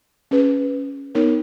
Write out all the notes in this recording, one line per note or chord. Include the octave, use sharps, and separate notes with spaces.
C#4 G#4 B4
B3 D#4 A#4 C#5